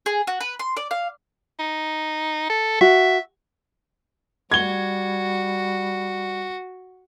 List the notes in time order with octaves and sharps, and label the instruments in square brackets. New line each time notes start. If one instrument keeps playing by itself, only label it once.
[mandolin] G#4
F#4
B4
C6
D5
F5
[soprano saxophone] D#4
A4
[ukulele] F#4 [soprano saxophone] E5
[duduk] G3 [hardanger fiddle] F#4 [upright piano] G#6 G7